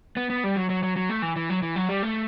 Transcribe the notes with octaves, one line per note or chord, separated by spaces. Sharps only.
B3
B3
G3
F#3
F#3
F#3
F#3
A3
E3
E3
F#3
E3
F#3
G3
A3